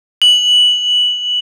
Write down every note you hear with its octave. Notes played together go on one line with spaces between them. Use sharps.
F#7